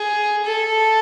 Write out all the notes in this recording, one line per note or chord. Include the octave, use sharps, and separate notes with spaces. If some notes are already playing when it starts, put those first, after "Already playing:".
Already playing: G#4
A4